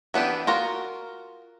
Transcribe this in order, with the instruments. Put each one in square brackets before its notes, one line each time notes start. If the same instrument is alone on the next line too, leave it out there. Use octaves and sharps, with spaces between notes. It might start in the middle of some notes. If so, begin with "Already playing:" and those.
[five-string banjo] E3 B3 D4 G4
F4 F#4 A#4